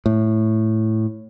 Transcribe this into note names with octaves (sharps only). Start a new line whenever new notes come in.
A2